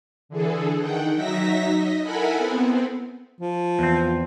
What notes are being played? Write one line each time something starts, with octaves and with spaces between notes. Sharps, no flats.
D3 E3 G#4 A4
D#3 F#5 G5
F#3 D#4 E5 A#6 B6
D#5
E4 A4 A#4 F#5 G#5 B5
B3 C4
F3
E2 C4